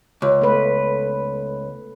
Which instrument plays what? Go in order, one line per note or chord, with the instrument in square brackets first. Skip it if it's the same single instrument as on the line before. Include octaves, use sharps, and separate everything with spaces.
[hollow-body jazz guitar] C#2
[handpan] A3 B4